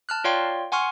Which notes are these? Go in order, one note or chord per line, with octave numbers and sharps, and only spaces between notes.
A5 F6 F#6
F4 C#5 D5 F5 G5 C6
F#5 G#5 C6 C#6 F6